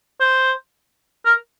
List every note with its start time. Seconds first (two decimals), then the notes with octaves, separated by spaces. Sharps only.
0.20 C5
1.25 A#4